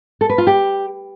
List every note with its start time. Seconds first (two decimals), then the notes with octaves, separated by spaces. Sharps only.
0.21 A4
0.30 B4
0.38 F4
0.47 G4